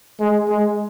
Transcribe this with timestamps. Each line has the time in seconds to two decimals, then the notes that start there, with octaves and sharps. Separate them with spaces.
0.20 G#3
0.48 G#3